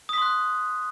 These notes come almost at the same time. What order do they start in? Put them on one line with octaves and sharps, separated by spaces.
D#6 B6 C6 F#6